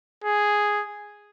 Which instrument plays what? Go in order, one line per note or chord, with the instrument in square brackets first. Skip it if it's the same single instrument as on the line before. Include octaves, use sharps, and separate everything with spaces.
[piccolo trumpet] G#4